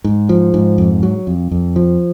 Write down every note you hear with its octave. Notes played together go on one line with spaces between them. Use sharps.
G#2
F3
G#2
F2
F#3
F2
F2
F3